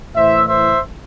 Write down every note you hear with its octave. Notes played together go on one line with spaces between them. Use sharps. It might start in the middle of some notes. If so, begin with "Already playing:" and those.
A2 E3 C5 E5
C5 E5